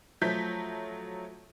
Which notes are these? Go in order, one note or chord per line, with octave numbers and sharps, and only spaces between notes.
F3 F#3 A3 G6 B6